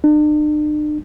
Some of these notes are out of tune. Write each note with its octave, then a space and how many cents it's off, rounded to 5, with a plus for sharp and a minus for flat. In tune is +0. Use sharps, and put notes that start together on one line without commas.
D4 +45